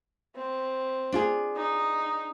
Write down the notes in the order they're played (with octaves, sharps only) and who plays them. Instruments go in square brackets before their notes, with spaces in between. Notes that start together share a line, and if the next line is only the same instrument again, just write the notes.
[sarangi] C4
[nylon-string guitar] D4 F4 G#4
[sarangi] D#4